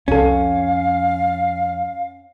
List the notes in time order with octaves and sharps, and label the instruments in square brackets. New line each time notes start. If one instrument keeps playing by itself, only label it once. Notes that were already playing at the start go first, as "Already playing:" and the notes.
[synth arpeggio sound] C2 A4 [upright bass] F2 [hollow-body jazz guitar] C#4 [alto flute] F5